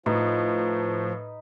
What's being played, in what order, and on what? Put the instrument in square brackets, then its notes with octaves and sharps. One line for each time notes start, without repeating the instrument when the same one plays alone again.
[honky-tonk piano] A2 [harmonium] F3 [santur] D#4 B4